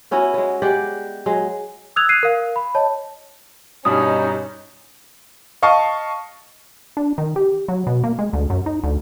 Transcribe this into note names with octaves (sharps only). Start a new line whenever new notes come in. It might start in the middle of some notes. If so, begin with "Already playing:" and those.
B3 C#4 E4 F#4
G#3 B3
G#3 G4 D5 F#5
F#3 G#3
D#6 E6 F#6 G#6 F7
F#6 G#6 C7 D#7
A#4 F5
B5
C#5 D#5 A5
G2 B2 G3 C#4 D#4 D#6
D#5 F5 A5 C#6
D4
D#3
G4
F#3
B2
A#3
G#3
D2
F#2
D#4
D2